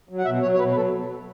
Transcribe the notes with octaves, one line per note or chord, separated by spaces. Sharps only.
F#3
F#5
B2 E5
F#3 C#5
C#5
B2 B4
B4
F#3 A4